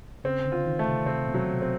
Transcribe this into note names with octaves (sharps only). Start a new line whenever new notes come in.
C#3 C4
D3
F4
D#3
A3
C3
C3 C4
B2
F#3
C3
C4